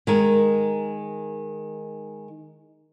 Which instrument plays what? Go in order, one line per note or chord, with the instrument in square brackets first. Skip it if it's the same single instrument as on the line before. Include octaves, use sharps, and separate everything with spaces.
[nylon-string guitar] D#3 G#3 A#4